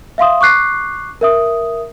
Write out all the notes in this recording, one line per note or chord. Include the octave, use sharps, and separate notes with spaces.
E5 F5 C6 D#6
C#6 D6 F#6 C7
A#4 E5 D#6